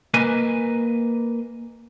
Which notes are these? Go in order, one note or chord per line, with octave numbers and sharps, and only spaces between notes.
A#3 B4 D#5 G#5